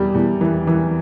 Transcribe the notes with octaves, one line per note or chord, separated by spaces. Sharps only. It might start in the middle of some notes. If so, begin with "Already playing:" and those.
Already playing: E2 G3
E2
E3
E3